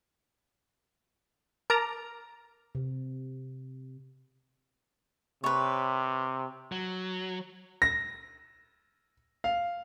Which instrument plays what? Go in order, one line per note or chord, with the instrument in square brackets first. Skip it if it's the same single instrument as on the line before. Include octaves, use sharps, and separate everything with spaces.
[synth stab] A#4 A5 D6 F6 A#6
[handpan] C3
[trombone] C3 [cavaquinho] B4 C#5
[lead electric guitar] F#3
[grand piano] A#6
F5